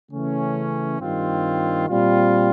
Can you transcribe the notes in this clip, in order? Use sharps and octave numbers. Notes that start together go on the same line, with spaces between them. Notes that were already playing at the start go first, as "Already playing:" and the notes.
C#3 E3 A3 C#4
G2 D#3 G3 C4 F4
A#2 G3 C4 F4